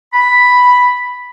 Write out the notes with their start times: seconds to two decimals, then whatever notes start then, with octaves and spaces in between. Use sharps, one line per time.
0.13 B5